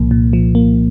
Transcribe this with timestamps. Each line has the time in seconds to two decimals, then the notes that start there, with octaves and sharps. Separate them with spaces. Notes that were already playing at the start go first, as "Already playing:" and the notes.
Already playing: C2 A#2 F3 A#3
0.11 A#2
0.33 F3
0.55 A#3